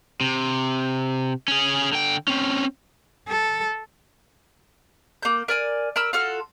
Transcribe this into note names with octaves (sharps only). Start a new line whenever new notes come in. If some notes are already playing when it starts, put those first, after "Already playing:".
C3
C#4 G#4
D3 G5
C4 C#4
A4
A#3 G6
A#4 D5 G#5
A#4 B5 E6
F4 F#4 A4 F6